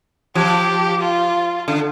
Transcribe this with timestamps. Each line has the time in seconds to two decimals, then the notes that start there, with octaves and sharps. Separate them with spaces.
0.35 F3 G4
1.01 F4
1.68 D3